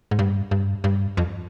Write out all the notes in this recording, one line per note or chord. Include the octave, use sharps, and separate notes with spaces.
G#2
G2
G2
G2
F2